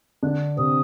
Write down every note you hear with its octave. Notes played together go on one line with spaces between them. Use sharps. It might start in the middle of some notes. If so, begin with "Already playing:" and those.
D3 D4 F#6
C3 C4 D#6